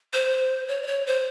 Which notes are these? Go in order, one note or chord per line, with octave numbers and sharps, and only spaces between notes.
C5
C#5
D5
C#5
C5